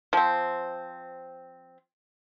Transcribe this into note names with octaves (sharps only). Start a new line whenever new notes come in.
F3 C4